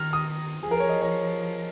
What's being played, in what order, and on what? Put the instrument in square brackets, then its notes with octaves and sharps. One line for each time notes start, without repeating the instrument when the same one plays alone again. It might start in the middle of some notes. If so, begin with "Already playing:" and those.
Already playing: [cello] D#3 [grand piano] F6
[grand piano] D#6
[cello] F3 [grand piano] G#4
[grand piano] A#4
C#5
D#5
C#5